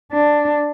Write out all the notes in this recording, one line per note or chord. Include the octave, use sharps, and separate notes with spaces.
D4